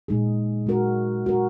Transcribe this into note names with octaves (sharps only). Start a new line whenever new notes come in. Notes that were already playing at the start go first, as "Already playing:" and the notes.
A#2 G#3 D#4 G#4
G#3 F#4 A#4
G#3 F#4 A#4